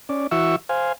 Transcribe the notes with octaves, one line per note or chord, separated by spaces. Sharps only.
C#4 D5
E3 F#4 E5 C#6 E6
C5 F5 G#5